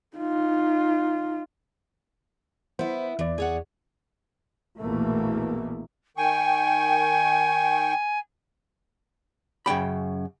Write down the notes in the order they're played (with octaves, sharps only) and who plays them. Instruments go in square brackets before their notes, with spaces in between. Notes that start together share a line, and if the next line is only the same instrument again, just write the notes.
[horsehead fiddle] D#4 F4
[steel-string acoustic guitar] B3 E4 [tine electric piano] C5
[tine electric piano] E2 D5 [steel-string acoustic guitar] E3
[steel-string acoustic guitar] G#4 C#5 F#5
[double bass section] A#1 E2 B2 E3 A3 A#3
[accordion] D#3 G5 C#6 [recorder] G#5
[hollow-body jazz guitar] F#2 C#3 G5 B5